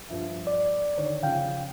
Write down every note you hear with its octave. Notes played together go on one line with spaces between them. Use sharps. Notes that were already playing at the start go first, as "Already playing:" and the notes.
G2 F3 E5
D5
D3 D#3 C#5
C#3 F3 C#4 F5 G5